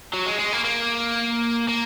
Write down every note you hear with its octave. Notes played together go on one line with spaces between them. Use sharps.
F#3
G#3
G#3
A#3
A#3
A#3